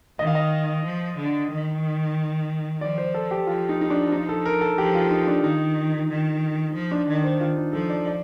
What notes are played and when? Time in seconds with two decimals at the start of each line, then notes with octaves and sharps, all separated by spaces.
0.19 D#3 D#5
0.27 F5
0.35 D#5
0.85 F3
1.18 D3
1.51 D#3
2.81 F3 D5
2.98 C5
3.14 A4
3.31 G4
3.47 F3 F4
3.69 D#4
3.81 D#4
3.90 D4
4.12 D#4
4.29 A4
4.45 A#4
4.61 A4
4.77 F3 G4
4.95 F4
5.11 D#4
5.27 D4
5.44 D#3 D#4
6.10 D#3
6.74 F3
6.91 D4
7.08 D#3
7.24 C5
7.40 F4
7.57 D#4
7.73 F3 A4
7.89 D5
8.06 D5